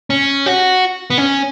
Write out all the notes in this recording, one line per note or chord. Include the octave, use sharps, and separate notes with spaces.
C#4
F#4
B3
C#4